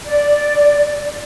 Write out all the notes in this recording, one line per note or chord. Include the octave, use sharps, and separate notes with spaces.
D5